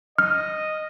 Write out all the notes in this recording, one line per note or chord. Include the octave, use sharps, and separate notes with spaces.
D#5 F6